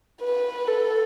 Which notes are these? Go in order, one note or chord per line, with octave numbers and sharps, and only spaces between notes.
B4
A4